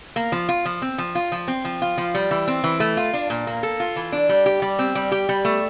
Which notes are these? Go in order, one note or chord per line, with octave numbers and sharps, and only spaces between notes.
A#3
F3
F4
F3
C4
F3
F4
F3
C4
F3
F4
F3
G3
E3
C4
E3
A3
F4
D4
A#2
A#3
A4
F4
E3
D4
G3
G4
G3
C4
G3
G4
G3
A3